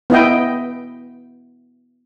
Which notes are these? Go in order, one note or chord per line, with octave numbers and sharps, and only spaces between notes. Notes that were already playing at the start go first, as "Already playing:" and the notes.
B3 E4 D#5 G5